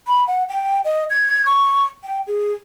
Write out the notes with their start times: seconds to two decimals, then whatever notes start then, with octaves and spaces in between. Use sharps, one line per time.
0.07 B5
0.27 F#5
0.49 G5
0.85 D#5
1.10 G#6
1.46 C#6
2.04 G5
2.27 G#4